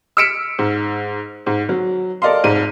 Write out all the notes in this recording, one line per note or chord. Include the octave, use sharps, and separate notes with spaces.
E6 F6 B6 C#7 D7 E7
G#2
G#2
F#3
A4 A#4 D5 D#5 F5 C6
F1 G#2 D#7